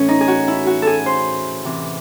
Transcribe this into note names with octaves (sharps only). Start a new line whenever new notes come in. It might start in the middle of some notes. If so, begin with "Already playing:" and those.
Already playing: A2 E3 C#4
D#4
G#4
F#4
E4
F#4
G#4 A4
C5
C3 E3